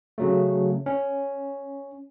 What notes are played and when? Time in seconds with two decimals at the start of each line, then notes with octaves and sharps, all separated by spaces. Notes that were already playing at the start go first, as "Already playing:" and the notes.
0.18 C#3 F#3 A3
0.86 C#4